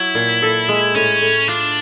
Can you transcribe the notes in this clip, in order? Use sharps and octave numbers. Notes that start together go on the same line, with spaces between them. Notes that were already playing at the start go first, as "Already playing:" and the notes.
Already playing: F#3 E4
A#2
A4
G#3
A2 C#4
A2
D4 F4